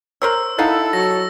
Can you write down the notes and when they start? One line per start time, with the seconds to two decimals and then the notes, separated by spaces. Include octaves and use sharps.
0.22 A#4 C5 C#5 E6
0.58 D#4 E4 A4 F5 F#5
0.93 F#3 C#5 A#6